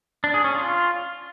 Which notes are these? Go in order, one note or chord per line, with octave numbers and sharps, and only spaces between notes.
D4
G#4
C#4
F4